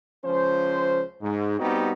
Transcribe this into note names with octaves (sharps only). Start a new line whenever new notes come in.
C#2 F3 C#4 C5
G#2
G3 B3 C4 D#4 F#4 G4